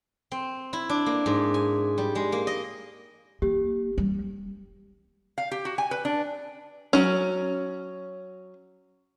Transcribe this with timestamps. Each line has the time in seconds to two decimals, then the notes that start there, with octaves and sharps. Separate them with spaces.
0.32 C4
0.73 E4
0.89 D4
1.06 A#3
1.26 G#2
1.54 G#5
1.98 G3
2.15 G#3
2.32 A#3
2.47 D#5
3.42 A#3 G4
3.98 G3
5.38 F5
5.51 G4
5.65 F#4
5.78 G#5
5.91 B4
6.05 D4
6.93 F#3 C#4